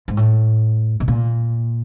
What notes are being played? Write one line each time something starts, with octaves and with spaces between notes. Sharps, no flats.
G#2
A2
B2
A#2